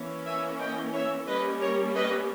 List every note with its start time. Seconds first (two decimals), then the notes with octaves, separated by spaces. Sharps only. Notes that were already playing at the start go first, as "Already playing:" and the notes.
Already playing: E3 A#3 C#4
0.25 E5 G#5
0.59 D#5 G5
0.93 C#5 E5
1.27 G3 A#3 C#4 B4 D#5
1.61 A#4 C#5
1.96 B4 D#5